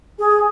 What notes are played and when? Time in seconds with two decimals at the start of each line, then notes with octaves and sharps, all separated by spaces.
0.19 G#4